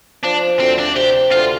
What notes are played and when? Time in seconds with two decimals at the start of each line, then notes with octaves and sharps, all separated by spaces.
0.23 F3 D4
0.59 D2 C4
0.78 D4
0.96 C3 G4
1.32 D2 F4